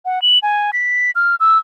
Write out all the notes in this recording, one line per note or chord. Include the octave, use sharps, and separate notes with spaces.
F#5
F#7
G#5
B6
F6
E6